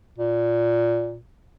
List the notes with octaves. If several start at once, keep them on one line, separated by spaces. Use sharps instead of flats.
A#2